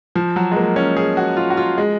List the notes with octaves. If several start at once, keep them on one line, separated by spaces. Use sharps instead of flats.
F3
F#3
G#3
A#3
C#4
G#4
F#4
F4
F#4
F4
G#3